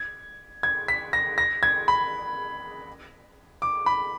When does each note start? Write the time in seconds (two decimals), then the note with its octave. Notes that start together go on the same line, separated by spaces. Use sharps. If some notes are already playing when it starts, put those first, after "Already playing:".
Already playing: G#6
0.63 G#6
0.88 B6
1.13 A#6
1.38 A#6
1.63 G#6
1.88 B5
3.62 D6
3.86 B5